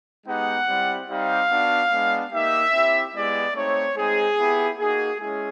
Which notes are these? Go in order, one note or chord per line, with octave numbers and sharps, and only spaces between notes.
G#3 B3 D#4 G4 F#5
G3 C4 E4
G3 C4 D#4 G4 F5
B3 D4 F#4
G#3 B3 D4
A#3 D#4 G4 E5
C4 E4 G4
G#3 B3 E4 G4 D5
A3 C4 D#4 C#5
G#3 C4 D#4 G#4
B3 E4 G4
A#3 D#4 F#4 G#4
G#3 C#4 E4 G#4